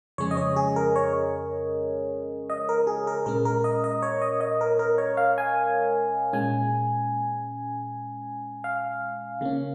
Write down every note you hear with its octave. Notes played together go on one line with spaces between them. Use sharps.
F2 C#3 G#3 C#4 C#5
D#5
C#5
G#4
A#4
C#5
D#5
A#4
G#4
A#4
A#2 G#3 C#4 A#4
A#4
D#5
D#5
C#5
D#5
D#5
A#4
A#4
C#5
F5
G#5
A#2 G#3 C#4 G#5
F5
C#3 A#3 C#4